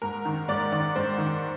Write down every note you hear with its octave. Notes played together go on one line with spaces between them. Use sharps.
G#2 A#4
D#3
G#2 D5
D#3 D5
G#2 C5
D#3